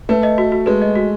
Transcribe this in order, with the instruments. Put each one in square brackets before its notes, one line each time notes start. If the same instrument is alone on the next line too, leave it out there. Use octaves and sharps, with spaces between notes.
[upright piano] A3 [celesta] B4
[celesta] D#5
F#4
F#4
[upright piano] G#3 [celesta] B4
[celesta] D#5
F#4